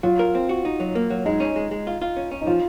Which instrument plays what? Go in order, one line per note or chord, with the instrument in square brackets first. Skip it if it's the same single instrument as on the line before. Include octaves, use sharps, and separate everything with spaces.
[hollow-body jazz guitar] F#3 [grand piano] F4
[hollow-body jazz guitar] A#4
C4
F#4
D#4
F#3
A#3
F#3
[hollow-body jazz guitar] G#3 [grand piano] D#4
[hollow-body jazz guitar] C#4
G#3
G#3
F4
F4
C#4
C#4
[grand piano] D#4
[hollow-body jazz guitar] F3 [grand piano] F4